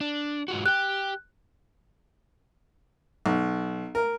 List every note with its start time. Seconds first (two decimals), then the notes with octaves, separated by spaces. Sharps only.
0.01 D4
0.48 G#2 F4 F#4
0.66 G4 G5 F#6
3.26 B1
3.95 A#4